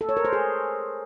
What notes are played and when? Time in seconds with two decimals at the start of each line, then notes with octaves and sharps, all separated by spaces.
0.01 A4
0.09 C#5
0.17 A#4
0.25 C5
0.33 G#4